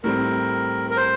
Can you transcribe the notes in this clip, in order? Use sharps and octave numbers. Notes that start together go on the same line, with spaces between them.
A2 G3 C4 A#4
A#4
C5